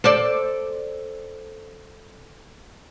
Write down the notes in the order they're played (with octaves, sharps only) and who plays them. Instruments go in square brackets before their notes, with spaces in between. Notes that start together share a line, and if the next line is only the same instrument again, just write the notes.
[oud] A4 C5 D5